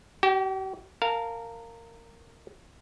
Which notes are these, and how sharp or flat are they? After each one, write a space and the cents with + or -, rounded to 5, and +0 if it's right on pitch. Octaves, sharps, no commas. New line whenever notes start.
G4 -45 G5 +0
A#4 -15 F5 +0 A5 +0